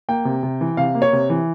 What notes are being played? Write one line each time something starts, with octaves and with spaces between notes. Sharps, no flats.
A#3 G5
C3
C3
E3
C3 F5
A#3
C#5
C3
E3